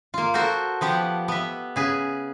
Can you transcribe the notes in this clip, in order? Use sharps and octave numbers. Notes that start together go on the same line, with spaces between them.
A#3 F4
F#4 A4 A#4 C5
F3 B3 G4 F#5
B3 E5
C#3 G#4 B4